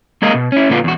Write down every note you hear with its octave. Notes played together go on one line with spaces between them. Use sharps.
G#3 A#3 G#4 A#4 D#5 F5
B2
C#4 E4
A#2 D3 B3 E4 F4
E2 F#4